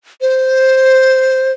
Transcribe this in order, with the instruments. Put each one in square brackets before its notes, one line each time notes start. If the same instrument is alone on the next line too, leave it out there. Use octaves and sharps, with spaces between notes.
[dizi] C5